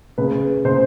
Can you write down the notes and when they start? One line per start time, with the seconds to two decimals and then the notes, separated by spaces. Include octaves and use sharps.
0.18 C#3 B4
0.65 C#3 C5